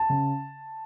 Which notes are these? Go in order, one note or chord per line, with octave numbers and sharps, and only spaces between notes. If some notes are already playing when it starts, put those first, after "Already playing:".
Already playing: A5
C#3